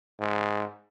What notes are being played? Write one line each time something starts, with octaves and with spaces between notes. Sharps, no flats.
G#2